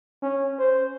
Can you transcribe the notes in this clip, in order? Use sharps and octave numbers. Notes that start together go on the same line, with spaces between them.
C#4
C5